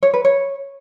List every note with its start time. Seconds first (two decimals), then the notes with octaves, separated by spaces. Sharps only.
0.03 C#5
0.14 B4
0.25 C#5